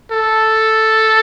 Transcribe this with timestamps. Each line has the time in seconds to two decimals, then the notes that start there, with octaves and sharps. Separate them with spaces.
0.11 A4